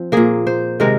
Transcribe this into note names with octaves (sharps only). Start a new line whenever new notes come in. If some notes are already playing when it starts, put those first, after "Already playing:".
Already playing: F3 C4
A#2 A#3 G#4
C5
C3 D#3 G#3 C4 A#4